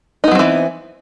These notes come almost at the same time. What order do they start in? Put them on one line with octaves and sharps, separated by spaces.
D#4 B3 F#3 C4 E3